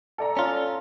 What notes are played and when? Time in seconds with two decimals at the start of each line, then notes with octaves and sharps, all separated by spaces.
0.18 A4 D5 A#5
0.37 C#4 F4